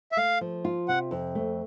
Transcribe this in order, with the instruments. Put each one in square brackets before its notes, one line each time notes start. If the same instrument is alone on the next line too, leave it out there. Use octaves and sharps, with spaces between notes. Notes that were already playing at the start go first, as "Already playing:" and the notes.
[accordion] E5
[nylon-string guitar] A3 [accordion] F5
[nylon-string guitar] F3
F4
[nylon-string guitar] C3 [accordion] F#5
[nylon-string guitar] F2
A3